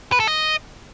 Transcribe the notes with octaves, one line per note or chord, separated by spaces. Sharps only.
B4
A4
D#5